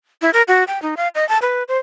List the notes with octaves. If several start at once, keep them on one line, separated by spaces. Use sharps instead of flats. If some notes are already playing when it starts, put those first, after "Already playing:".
E4
A#4
F#4
G5
D#4
F5
D#5
A5
B4
C5